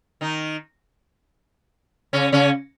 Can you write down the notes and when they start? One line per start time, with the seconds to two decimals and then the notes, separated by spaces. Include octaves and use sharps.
0.21 D#3 D#4
2.13 C#3 C#4
2.32 C#3 C#4